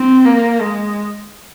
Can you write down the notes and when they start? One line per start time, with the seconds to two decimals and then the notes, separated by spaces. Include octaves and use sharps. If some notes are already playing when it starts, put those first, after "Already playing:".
Already playing: C4
0.25 A#3
0.61 G#3